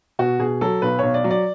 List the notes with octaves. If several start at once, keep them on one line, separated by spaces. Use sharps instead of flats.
B2 F#4
B2 G#4
F#3 A4
B1 B4
B1 C#5
D5
F#3
D5